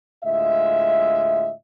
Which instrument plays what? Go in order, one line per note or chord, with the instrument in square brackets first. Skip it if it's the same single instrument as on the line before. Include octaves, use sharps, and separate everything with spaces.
[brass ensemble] D2 A2 G#3 F4 D#5 E5